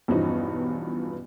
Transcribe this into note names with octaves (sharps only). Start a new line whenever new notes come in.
E2 G2 B2 F3 C#4 D#4